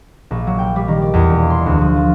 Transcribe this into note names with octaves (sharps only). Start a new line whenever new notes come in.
A#1
F#3
G5
G3
D#3
D5
E2
E1
C6
D2
F3
F4